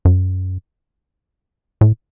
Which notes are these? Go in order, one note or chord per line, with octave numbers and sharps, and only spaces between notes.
F#2
A2